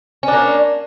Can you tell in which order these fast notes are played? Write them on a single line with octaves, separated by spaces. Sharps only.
C#4 D4 A#3